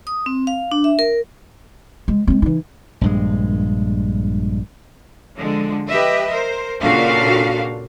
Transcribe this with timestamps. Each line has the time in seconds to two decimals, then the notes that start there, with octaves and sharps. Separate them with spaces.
0.07 D#6
0.26 C4
0.47 F5
0.72 D4
0.84 E5
0.99 A#4
2.08 G#3
2.27 G#3 C4
2.42 E3 D#4
3.01 A#1 G2 G#3
5.37 D3 F3 G#3
5.88 G4 B4 D#5 E5
6.30 A#4 C5
6.82 A#2 C#3 D4 F#4 A4 F5